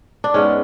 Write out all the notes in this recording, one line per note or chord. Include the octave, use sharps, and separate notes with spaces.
D4
G#2 G#3 B3 C#4